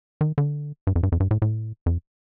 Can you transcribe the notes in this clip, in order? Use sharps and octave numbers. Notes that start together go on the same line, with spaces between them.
D#3
D3
G2
F2
G2
F2
G2
A2
A2
F2